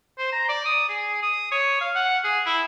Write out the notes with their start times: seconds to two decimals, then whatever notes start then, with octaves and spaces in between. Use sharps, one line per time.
0.19 C5
0.33 A#5
0.49 D5
0.66 D#6
0.89 G#4
1.22 D#6
1.52 C#5
1.81 F5
1.95 F#5
2.24 G#4
2.46 E4